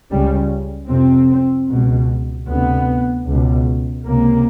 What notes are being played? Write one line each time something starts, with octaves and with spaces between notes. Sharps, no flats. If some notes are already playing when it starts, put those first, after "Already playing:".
C#2 C#3 G3
F2 C3 C4
C#2 B2
D2 C3 B3
C#2
B2
C#2 C3 A#3